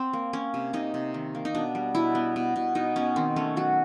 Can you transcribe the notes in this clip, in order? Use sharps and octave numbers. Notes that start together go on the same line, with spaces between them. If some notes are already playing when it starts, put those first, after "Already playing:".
Already playing: C4
A#3
A#3 C#4
C3
C3 D#4
C3
D#3
A#3
D#4
B2 D4
G3
B2 E4
B3
B2
B2
B2 D#4
B2 C#4
D#3 C4
A3 C#4
F#3 F#4